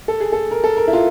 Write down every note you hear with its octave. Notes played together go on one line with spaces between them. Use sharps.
A4
G#4
A4
A#4
A4
A#4
E4
F4